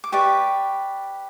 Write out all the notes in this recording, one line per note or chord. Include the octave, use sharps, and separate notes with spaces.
D6
G4 B4 D5 C#6